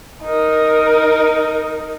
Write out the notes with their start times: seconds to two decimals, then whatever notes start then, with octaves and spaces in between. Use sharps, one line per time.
0.23 D#4 A#4